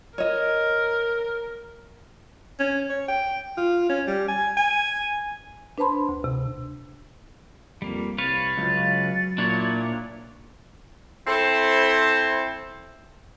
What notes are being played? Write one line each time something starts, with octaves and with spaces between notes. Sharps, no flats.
A#4 C#5 D#5
C#4
C#5
G5
F4
C#4
G3
G#5
G#5
D4 B4 C5 A5 B5 C6
D2
C3
F2 G3 A#3
C2 B4 C#5 F5 A6
C#2 F#3
A#2 D4 E4 C#5
C4 E4 A4 C5